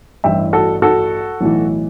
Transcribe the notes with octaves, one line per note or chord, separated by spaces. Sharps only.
A1 G2 E3 E5 G5
F#4 A4
F#4 A4
B1 A2 E3